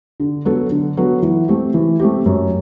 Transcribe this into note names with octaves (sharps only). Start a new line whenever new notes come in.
D3
F#3 B3 F#4 A4
D3
F#3 B3 F#4 A4
E3
A3 C4 G4
E3
A3 C4 G4
F#2